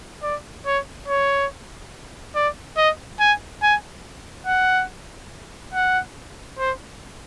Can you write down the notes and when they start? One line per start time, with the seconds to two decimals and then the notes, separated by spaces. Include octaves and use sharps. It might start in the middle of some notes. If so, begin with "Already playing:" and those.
0.23 D5
0.66 C#5
1.08 C#5
2.35 D5
2.77 D#5
3.20 G#5
3.63 G#5
4.46 F#5
5.74 F#5
6.59 C5